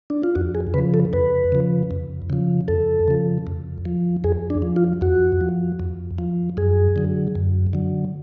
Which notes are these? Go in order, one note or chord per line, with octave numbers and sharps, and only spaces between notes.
D4
F4
F2 F#4
G#4
C#3 F3 B4
A4
F2 B4
C#3 F3
F2
C#3 F3
F2 A4
C#3 F3
F2
F3
F2 G#4
D4
F3
F4
F2 F#4
F3
F2
F3
F#2 G#4
D3 F#3
F#2
D3 F#3